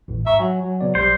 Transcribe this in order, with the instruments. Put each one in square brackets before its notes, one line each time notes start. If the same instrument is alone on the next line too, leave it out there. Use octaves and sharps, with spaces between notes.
[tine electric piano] A1 D#2 A2
[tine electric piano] G#2 A#5 C#6 [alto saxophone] E5
[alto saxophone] F#3 [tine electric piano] G#5
[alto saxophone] F#3
[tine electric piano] C#3 B3 D5
[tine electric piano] B1 [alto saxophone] G3 [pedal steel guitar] C5